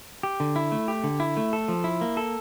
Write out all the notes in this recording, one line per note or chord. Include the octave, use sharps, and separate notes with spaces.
G4
D3
E4
A3
G4
D3
E4
A3
A4
F3
E4
A#3
A4